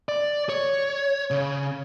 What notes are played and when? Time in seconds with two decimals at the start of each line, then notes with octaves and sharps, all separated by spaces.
0.09 D5
0.49 C#5
1.31 C#3